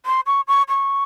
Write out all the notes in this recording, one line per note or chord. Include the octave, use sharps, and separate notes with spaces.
C6
C#6
C#6
C#6